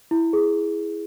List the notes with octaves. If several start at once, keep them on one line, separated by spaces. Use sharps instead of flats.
E4
G#4